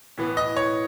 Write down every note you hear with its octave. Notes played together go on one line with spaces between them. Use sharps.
A2 E3 B3
D#5
C#5